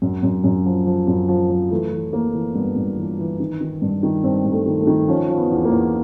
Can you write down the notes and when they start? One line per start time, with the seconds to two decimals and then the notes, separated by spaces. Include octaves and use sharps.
0.02 F#2
0.23 F#2
0.44 F#2
0.65 F3
0.86 F3
1.08 F#2
1.28 F3
1.50 F3
1.71 E3 A3
1.92 E3
2.13 E3 A#3
2.34 E3
2.55 G2 B3
2.76 G2
2.98 E3
3.19 E3
3.40 D#3
3.61 D#3
3.82 G2
4.03 D#3
4.24 G2 C4
4.45 G2
4.52 A3
4.67 D#3
4.80 A3
4.87 D#3
5.08 F3 C#4
5.29 F3
5.37 B3
5.51 E2
5.65 A#3
5.71 E2